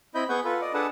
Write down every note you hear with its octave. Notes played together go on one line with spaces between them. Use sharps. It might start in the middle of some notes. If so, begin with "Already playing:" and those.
C4 E4 D#5 B5 G6
B3 G#4 F#5 C#6 G6
F4 A4 B4
D5 D#5
D4 G#4 A4 B4 F#5 A5